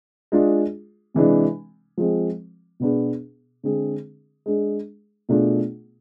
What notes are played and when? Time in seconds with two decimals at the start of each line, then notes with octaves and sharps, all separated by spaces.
0.32 G#3 D4 F4 G#4
1.14 C3 E3 G#3 D4
1.98 F3 G#3 C4
2.80 B2 B3 D4 G#4
3.63 D3 G#3 C4 G#4
4.46 G#3 D4 G#4
5.29 B2 A3 D4 F4 G#4